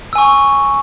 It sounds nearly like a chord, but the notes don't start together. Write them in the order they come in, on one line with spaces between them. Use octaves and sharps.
E6 G#5 C#6